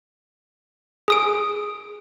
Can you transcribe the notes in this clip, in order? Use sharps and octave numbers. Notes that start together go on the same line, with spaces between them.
G#4 D#6 D7